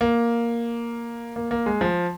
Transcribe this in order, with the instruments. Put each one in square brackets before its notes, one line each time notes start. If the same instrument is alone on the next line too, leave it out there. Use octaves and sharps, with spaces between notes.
[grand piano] A#3
A#3
A#3
G#3
F3